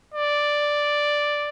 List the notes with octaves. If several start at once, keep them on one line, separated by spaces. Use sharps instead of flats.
D5